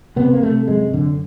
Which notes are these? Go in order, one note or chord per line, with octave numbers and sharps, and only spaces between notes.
C3 B3
A#3
C3 A3
F#2 G#3
F#2 D3